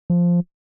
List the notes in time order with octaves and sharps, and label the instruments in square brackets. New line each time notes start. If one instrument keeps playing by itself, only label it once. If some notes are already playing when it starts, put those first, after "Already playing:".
[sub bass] F3